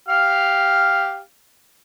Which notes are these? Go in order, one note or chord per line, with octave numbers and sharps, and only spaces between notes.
G4 F5 F6